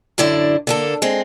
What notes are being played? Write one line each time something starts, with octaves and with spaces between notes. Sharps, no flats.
F#2 A2 D3 E4 D5
D3 A#3 A4
G#3 C4